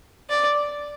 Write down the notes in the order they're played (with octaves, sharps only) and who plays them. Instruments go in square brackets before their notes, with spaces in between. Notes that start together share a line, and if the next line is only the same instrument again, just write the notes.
[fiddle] D5